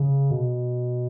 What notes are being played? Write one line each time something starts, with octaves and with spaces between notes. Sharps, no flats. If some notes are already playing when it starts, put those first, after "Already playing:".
Already playing: C#3
B2